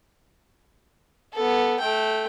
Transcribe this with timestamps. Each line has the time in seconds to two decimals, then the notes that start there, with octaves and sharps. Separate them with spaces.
1.33 B3 A4
1.80 A3 G5